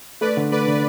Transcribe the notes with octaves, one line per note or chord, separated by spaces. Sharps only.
A3 B4 D5
D3
A3 B4 D5
D3